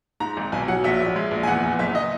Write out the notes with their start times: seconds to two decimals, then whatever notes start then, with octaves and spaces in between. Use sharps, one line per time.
0.20 G#2 A#5
0.37 G#1
0.52 B1 G#5
0.68 F#3 F#5
0.84 A#1 E5
1.00 A#1
1.16 G#3
1.31 A#1
1.43 G#5
1.47 E2 F#5
1.63 E2
1.79 F#1 E5
1.95 D#5